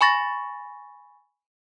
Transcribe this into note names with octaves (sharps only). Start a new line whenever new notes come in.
G#5 B5 C#6 A6 A#6